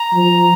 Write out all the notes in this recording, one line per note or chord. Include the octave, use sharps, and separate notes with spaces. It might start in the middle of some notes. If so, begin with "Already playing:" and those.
Already playing: A#5
F3